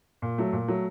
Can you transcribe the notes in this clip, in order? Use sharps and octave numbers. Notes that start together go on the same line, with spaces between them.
A#2
F#3 A3
A#2
F#3 A3